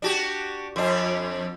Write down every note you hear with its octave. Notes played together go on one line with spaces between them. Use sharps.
D4 F#4 G4
F2 D4